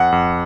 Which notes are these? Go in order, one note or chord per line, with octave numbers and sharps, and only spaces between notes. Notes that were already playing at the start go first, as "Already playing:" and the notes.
Already playing: F2 F#5
F2